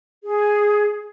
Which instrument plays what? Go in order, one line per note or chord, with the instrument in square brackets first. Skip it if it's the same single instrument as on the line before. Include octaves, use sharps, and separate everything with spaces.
[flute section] G#4